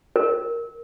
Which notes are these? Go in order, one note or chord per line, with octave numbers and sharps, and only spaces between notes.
A#4